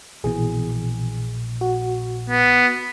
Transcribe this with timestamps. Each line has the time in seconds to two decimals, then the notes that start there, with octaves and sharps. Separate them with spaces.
0.24 A#1 B2 E3 G#4
1.61 F#4
2.30 B3